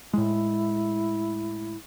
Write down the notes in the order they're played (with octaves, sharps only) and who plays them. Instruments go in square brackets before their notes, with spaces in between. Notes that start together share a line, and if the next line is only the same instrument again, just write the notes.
[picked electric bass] A2 G#3 [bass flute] E4